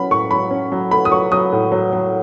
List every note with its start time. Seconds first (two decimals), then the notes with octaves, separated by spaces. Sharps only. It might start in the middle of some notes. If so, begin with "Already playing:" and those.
Already playing: F#3 C#4 B5
0.11 A2 C#6
0.31 F#3 B5
0.51 C#4
0.72 F#3
0.91 A3 B5
1.05 D#6
1.11 F#3 C#6
1.32 F#3 D#6
1.52 A2
1.72 F#3
1.93 F#3